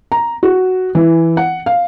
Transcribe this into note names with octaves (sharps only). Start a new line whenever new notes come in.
A#5
F#4
E3
F#5
F5